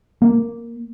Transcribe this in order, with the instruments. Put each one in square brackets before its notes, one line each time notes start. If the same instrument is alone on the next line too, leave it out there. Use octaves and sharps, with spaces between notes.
[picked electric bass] A#3